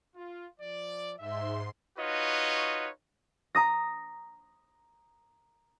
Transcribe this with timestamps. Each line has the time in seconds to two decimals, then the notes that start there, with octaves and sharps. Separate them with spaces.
0.15 F4
0.60 F3 D5
1.19 G#2 E5 C6
1.98 D#4 F4 F#4 B4 C#5 D#5
3.55 A#5 D#6 A#6